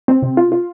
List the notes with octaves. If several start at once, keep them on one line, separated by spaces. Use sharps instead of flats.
C4
C3
F4
F4